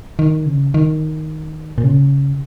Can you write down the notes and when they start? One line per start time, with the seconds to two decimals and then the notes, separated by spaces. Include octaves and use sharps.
0.19 D#3
0.46 C#3
0.74 D#3
1.78 A#2
1.83 C#3